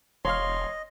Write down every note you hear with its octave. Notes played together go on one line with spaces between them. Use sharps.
E1 C#5 D#5 F5 C6 F6